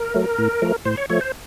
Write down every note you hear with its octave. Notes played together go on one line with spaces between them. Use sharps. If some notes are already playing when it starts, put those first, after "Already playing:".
Already playing: A#4
F#3 A3
A2
F3 A3
A2 C5
C#5
F3 A3 C#5
C5